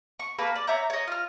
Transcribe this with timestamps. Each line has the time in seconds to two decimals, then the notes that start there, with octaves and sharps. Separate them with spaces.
0.20 C#6
0.39 A#3 A4 B4
0.56 D5
0.67 C#5 E5 A#5 G6
0.90 C#5 D#5
1.07 F4 F6